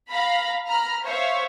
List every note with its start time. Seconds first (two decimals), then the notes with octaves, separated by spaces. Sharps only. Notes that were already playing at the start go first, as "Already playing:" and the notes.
0.10 F5 A#5 B5
0.67 A#5 B5 F6
1.03 C5 C#5 E5 F5